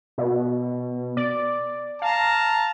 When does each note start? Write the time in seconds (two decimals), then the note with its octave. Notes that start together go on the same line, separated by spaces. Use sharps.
0.18 B2
1.17 D5
2.02 F5 A5 A#5